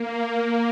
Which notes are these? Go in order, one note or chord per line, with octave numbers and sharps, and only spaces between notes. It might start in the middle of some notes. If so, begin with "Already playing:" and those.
Already playing: A#3
A#3